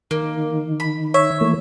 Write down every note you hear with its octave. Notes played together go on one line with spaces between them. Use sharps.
D#3 A#3
B5
C#5 E5
E3 A3 A#3